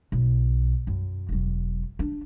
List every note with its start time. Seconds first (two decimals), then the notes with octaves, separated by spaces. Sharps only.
0.12 B1
0.87 F#2
1.29 E1 F#3
1.99 D4